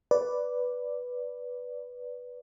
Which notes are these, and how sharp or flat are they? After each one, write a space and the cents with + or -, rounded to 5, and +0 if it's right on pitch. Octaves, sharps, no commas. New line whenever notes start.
B4 +0 D5 -5